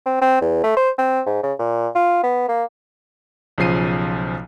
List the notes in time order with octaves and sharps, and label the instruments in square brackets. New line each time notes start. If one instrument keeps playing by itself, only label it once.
[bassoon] C4
C4
E2
A3
C5
C4
G#2
C#3
A#2
F4
B3
A#3
[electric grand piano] B1 C#3 F3 C7 D#7